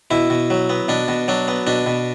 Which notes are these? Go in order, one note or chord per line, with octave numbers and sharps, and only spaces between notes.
B2 E4
B2
F#3
B3
B2 D4
B2
F#3 D4
B3
B2 D4
B2